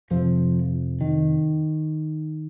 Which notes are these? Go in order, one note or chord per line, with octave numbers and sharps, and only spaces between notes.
F2 C3 F3
D#3